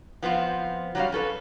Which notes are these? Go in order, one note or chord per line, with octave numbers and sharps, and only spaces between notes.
F3 B3 C4 F4
F#3 G3 C#4 F5
C#4 A4 B4